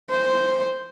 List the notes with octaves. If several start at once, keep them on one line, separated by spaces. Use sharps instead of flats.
C5